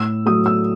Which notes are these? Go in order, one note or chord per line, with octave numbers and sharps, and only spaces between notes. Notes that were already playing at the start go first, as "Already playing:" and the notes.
Already playing: A2 E6
F#3 A3 D#6
E6